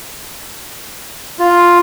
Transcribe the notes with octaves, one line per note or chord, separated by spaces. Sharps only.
F4